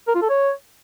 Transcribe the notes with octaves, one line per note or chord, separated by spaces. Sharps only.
A#4
F4
A4
C#5